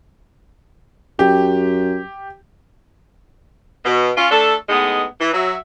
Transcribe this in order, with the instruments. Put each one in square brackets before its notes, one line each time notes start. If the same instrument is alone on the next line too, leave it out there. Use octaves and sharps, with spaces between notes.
[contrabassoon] F#2 [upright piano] G4
[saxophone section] B2
C#4 F4
A3 D4 A4
A2 G#3 B3 D#4
E3
F#3 E5